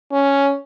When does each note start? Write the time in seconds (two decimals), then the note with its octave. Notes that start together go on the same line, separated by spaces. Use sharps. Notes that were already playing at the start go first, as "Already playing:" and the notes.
0.12 C#4